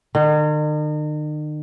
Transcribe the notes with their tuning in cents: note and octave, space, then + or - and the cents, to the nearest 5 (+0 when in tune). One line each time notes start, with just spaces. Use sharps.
D#3 -45